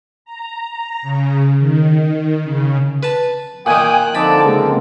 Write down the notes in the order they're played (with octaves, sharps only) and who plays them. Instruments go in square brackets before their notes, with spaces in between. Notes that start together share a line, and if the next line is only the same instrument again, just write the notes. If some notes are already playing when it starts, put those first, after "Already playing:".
[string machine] A#5
C#3
D#3
C#3
[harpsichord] B4 A5
[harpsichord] A#2 D#3 [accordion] G5 G#5 D#6 [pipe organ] F#6
[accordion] D3 F3 C4 [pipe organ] D#4 A5 D6 [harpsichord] B5
[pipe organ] C#3 G#3 A#3